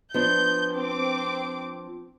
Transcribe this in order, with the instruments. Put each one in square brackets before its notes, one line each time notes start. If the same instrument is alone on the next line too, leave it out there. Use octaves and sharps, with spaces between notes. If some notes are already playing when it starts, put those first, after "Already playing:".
[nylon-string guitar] F3 B3 D4 [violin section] G6
[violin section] C4 D6